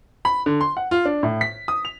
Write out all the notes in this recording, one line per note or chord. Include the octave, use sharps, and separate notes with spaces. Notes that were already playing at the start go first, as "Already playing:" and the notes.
B5
D3
C6
F#5
F4
D4
A2
B6
D#6
F7